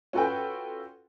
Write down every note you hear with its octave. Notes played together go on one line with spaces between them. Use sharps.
C#4 F4 F#4 A4 B4 G5